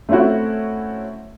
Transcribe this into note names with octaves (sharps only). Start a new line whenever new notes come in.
A3 C4 C#4 E4 F#4